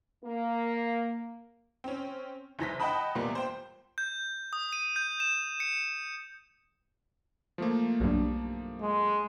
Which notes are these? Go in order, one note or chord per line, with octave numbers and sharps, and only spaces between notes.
A#3
C4 C#4
F#1 E3 A#6 B6
D#5 F#5 G5 A5 B5 D#6
E2 A#2 G3 A#3 B3
C5 G5
G6
D#6
D#7
G6
E7
C#7
F3 A3 A#3
B1 G2
G#3